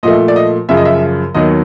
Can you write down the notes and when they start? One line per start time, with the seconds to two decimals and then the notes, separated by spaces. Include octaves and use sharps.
0.03 A#2 F3 A3 D#5
0.28 D5
0.36 D#5
0.69 F#2 C#3 F3 E5
0.77 D#5
0.85 E5
1.35 D#2 D#3 F#3 B3 D#5